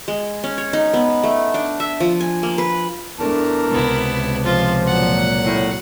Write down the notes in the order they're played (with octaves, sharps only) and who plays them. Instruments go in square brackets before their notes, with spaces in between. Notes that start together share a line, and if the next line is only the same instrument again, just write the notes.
[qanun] G#3
C#4
C#5
D#4
B3
A3
D4
E5
F3
G#5
A#3
B4
[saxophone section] E2 A#4 [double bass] A3 D4 [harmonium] A5
[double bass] C#2 C3 [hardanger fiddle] B3 E4
[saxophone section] F3 [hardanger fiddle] F4
[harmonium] A#2 F#3 [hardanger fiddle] F#5
[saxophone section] A2